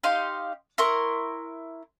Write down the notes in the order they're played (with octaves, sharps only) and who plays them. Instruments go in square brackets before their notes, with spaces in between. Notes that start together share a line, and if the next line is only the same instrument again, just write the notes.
[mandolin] D#4 G4 F5 C6
E4 A#4 C6 C#6